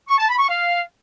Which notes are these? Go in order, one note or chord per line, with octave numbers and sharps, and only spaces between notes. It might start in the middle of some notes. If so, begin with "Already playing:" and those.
C#6
A5
B5
C#6
F5